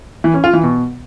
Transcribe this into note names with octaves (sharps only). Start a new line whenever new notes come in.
E3
C#4
F4
E3
B2